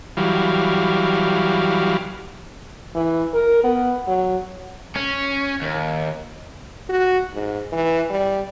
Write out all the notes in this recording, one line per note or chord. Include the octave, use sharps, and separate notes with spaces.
E3 F#3 G3 F5
E3
A#4
B3
F#3
C#4
D#2
F#4
G#2
E3
G3